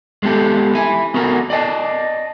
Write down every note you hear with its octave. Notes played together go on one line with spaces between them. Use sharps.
G#3 B3 G4 A4
E4 G#5
B3 F#4 A4 A#4 F#5 A#5
D5 D#5 G#5 A5